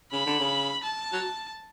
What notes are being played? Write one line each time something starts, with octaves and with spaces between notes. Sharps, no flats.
C#3 B5
D3
C#3
A5
F#3